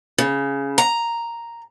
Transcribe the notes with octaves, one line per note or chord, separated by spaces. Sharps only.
C#3
A#5